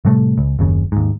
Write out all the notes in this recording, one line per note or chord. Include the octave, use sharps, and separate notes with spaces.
A2 C3 G3 A3
C#2
F#1 D#2 C#3
D#2 G#2